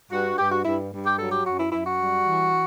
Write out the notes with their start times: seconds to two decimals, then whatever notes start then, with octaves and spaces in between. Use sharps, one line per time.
0.10 G2 F#4
0.37 G2 G4
0.51 F#4
0.65 G2 E4
0.92 G2
1.05 G4
1.18 F#3 A4
1.31 G4
1.45 F#2 F#4
1.59 E4
1.72 F#2 E4
1.86 F#4
1.99 G3
2.26 E3